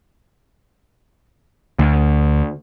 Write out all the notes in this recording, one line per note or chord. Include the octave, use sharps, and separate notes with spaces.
D2